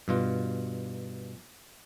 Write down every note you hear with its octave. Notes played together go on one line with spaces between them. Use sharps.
G2 B2 F4